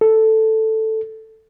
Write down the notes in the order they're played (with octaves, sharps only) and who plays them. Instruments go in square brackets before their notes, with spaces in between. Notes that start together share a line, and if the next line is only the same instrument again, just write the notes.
[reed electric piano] A4